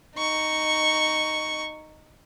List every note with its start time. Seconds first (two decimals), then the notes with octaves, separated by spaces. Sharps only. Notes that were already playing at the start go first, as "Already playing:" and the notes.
0.16 D#4 C#6